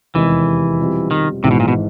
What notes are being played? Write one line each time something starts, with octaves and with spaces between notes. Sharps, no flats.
F1 E2 C3 D#3 E3 G#3
B2 G3 C4 F4
D#3
G#1 G#2 C3 E3
B2
A#2
B2